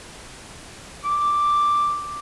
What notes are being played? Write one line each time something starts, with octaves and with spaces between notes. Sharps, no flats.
D6